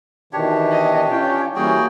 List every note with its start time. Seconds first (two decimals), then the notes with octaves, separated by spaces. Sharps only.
0.33 B2 D#3 E3 D4 G4 C#5
0.72 D#5
1.11 C#4 F4 G5
1.56 E3 G3 A#3 C#4 F#4 G#4 G5